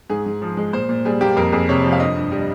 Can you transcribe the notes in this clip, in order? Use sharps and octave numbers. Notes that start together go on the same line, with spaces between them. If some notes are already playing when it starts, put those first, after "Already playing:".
G#2 G#4
G#2
F3
G#3
A#2 C5
A#2
G3 G#4
A#3 G4
F2 A#4
F2 G#4
C3 C#5
F3
F5
G2 D#5
G2
G3